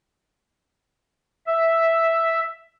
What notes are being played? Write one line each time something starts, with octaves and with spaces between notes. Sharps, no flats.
E5